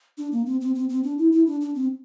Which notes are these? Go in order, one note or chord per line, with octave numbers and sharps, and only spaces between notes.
D4
A#3
C4
C4
C4
C4
D4
E4
E4
D4
D4
C4